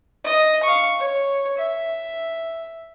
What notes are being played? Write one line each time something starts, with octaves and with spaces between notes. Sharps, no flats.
D#5
F5 C#6
C#5
E5